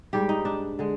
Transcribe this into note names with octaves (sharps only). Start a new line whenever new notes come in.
G#2 G3 G4
D#4
D4
D3 G#3